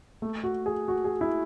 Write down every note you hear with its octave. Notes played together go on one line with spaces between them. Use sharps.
A3
F#4
G#4
F#4
G#4
E4